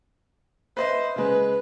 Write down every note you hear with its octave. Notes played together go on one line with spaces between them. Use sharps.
B4 C5 D#5 E5
C#3 G#3 B4